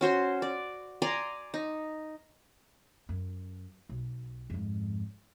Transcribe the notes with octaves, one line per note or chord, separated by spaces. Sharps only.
C#4 F#4 C5 C6
D5
D5 G#5 A#5 C6
D#4
F#2
B1
F2 G#2